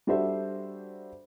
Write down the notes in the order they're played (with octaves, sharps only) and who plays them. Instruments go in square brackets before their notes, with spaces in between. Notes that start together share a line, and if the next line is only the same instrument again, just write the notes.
[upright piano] G3 D4 F#4 A4 C5 E5